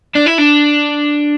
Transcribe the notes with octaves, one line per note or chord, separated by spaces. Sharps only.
D4
E4
D4